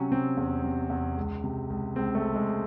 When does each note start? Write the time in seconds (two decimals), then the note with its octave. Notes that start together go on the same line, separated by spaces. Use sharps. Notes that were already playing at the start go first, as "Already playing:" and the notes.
Already playing: C3 F#3 C#4
0.11 C3 C4
0.37 E2
0.64 C3
0.90 E2
1.17 C#2
1.44 C3
1.70 C#2
1.96 C#2 C4
2.15 A3
2.21 C#2
2.36 G#3